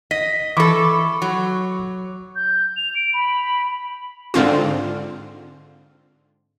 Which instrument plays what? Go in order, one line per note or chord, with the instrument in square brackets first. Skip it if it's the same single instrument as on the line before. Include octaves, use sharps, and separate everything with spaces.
[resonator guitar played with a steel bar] D#5 [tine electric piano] B6
[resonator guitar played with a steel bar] E3 A4 [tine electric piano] B5 C#6 D6
[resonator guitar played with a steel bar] F#3
[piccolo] G6
F7
D7
B5
[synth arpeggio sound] G#2 D3 C4 F4